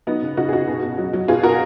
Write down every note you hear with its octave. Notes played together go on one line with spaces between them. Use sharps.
F#3 B3 D#4
C#3
C#3 D#4 F#4
G#4
C#3 D#4 F#4
B2
B2
F#3
F#3
B2 F4 G#4
B2 F#4 A#4